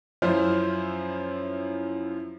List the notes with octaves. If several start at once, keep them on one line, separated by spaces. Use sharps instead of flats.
F#2 F3 E4 F4 C5 F6